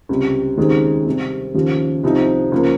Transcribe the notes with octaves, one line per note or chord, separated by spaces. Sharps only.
C#2 C3 G3
D#2 C#3 G#3 C4 D#4
C3 G3 C4
D#2 C#3 F3
C2 C3 F3 C4 D#4
C#2 C#3 F3 A#3